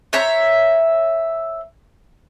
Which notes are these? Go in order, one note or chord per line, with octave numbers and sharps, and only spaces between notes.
C5 C#5 E5 A#5